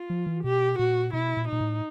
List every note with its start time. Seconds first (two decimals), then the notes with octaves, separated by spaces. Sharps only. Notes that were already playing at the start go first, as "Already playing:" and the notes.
Already playing: F4
0.10 F3
0.27 E3
0.44 B2 G4
0.79 A#2 F#4
1.13 B2 E4
1.37 A#2
1.49 A#2 D#4
1.61 A2